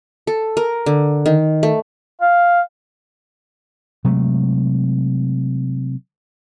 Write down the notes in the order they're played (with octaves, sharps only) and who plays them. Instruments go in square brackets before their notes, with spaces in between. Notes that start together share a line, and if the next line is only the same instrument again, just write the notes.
[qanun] A4
A#4
D3
D#3
A3
[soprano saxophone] F5
[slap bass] C3 F#3 G#3 A3